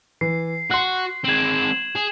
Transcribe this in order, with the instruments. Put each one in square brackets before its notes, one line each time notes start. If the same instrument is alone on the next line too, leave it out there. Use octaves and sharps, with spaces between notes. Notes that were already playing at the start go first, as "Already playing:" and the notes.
[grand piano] E3 [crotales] C7
[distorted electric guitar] F#4 [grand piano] C6 F#6
[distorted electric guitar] G#3 C4 [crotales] G#6 E7 F#7
[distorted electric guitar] G#4